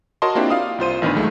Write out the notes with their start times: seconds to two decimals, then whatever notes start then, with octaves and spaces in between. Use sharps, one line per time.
0.22 F#4 A#4 C#5 D#5 A5 C6
0.35 A#3 C4 D4 E4 F4 G4
0.50 D5 F5 D#6
0.78 C2 F4 C5 D#7
1.02 A1 D#3 B3 D4 B5
1.14 B1 D#3 G#3 A3